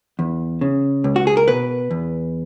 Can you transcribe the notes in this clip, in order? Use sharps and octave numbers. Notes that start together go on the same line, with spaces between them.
E2
C#3
C#2
F#4
G#4
A#4
B2 B4
E2